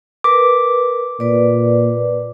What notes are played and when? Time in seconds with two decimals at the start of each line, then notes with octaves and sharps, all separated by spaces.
0.24 A#4 B4 D6
1.20 A#2 B4 D5